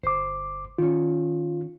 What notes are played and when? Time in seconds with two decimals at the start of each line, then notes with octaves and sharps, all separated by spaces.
0.03 G1 C5 D6
0.78 D#3 C#4 F4